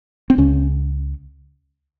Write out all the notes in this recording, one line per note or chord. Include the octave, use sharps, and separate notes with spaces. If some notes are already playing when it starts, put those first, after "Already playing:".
C4
C#2 C#3 C#4